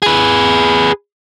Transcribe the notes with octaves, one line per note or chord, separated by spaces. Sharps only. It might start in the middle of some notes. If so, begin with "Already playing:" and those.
G#4 B4